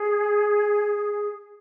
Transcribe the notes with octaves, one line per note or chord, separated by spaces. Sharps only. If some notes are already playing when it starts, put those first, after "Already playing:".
Already playing: G#4